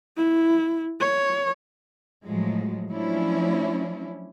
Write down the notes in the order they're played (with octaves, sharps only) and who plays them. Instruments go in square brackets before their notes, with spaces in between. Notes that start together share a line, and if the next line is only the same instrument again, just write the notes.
[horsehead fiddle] E4
C#5
[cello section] A2 F3 F#3 G#3
F3 F#3 A3 C#4 D4 E4